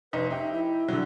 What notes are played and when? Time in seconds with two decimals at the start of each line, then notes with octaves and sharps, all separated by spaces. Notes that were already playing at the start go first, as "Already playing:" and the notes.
0.13 F1 D#4 B4
0.30 D#4 G4 E5
0.53 E4
0.89 D3 F#3